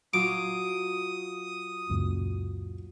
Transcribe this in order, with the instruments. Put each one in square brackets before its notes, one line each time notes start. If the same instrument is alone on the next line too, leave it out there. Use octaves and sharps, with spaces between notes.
[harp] F#3 F4 [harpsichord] D6 [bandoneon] D#6
[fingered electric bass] C#2 F#2 A#2